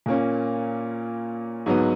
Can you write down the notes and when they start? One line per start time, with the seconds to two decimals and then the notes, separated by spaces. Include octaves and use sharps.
0.06 A#2 A#3 C#4
1.66 G#2 F#3 B3